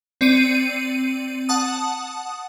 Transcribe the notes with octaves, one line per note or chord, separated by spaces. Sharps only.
C4 D5 C#7 D#7
F#5 A5 D#6